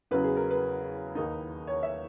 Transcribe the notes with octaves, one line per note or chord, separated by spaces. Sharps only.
E2 C#3 F#3 B4
G#4
A#4
B4
D#2 D#3 A#3 D#4
C#5
E5